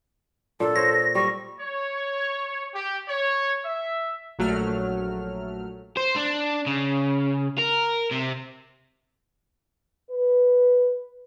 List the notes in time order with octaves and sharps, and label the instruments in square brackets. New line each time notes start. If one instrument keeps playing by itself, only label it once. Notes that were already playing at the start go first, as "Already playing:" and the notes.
[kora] A#2 D4 [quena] A4
[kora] C5 C#5 [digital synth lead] A#6
[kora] G3 [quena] C#6
[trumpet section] C#5
G4
C#5
E5
[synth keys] A#1 F#3 A3 F6
[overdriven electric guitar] C5
D4
C#3
A#4
C3
[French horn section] B4